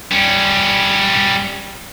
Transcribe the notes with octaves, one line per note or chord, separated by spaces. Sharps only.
G3 C#4